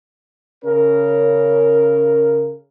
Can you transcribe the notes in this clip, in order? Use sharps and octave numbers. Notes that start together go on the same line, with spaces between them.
C#3 C#4 A#4